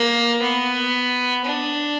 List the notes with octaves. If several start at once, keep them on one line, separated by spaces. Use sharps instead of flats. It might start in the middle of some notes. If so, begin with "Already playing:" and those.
Already playing: A#3
B3
D4